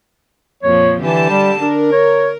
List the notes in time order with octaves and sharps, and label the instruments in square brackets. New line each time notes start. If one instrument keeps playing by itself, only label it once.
[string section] F2 A#2 F3 [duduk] C#5
[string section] D3 G4 A5 [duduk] E3
[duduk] G3
[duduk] D4 [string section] A#4
[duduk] C#5